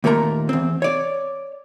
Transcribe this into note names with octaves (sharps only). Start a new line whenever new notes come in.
D#2 A#2 A3 A#4 A#5
E2 C4
C#5 D5